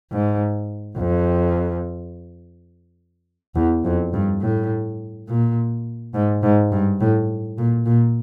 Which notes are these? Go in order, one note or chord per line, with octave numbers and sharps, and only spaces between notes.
G#2
F2
E2
F2
G2
A2
A#2
G#2
G#2
G2
A2
A#2
A#2